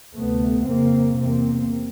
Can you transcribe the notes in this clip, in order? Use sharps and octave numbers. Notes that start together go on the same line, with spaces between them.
D2 C3 A3 B3
F2 C#3 A#3 C4
E2 C3 A#3 C4